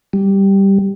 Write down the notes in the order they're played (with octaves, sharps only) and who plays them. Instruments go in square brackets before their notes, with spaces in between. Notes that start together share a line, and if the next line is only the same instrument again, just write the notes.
[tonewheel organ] G3